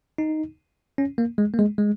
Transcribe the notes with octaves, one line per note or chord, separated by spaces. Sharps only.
D#4
C#4
A#3
G#3
A#3
G#3
G#3